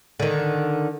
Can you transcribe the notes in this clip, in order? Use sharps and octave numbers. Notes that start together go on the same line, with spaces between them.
D3 D#3